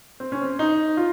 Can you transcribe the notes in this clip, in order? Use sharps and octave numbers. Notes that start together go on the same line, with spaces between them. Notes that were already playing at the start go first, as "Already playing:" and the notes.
C4
C#4
C4
D#4
F4